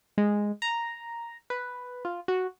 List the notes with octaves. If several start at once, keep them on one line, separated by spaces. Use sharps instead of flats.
G#3
A#5
B4
F4
F#4